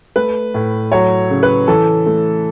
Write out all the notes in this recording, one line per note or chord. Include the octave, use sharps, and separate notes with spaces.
A3 B4
A2
F#3 C#5
C#3
B4
E3 A4
A3